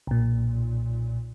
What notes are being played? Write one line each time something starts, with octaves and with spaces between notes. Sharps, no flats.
B1 A#2